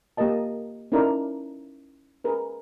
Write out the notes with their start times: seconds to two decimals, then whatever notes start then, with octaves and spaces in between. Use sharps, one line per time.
0.17 A#3 G4 A#4 D#5 A5
0.92 C#4 D#4 E4 A4 A#4 D5
2.24 G#4 A#4 B4